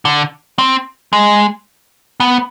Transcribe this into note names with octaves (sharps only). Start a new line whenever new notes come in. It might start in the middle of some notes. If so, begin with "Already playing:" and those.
D3
C4
G#3
B3